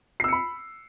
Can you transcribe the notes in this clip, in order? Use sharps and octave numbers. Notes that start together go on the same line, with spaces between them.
B5 E6 C7 C#7